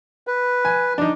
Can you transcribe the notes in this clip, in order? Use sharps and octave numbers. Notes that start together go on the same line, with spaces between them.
B4
G#5
D4 D#4